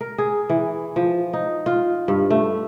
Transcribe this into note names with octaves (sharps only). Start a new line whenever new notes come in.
A#4
G#4
E3
F3
D#4
F4
G2
A3